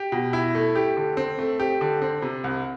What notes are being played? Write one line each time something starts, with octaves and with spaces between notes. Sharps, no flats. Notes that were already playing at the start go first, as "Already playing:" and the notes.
Already playing: G4
B2
E4
A3
G4
D3
C4
A3
G4
D3
C4
C3
C2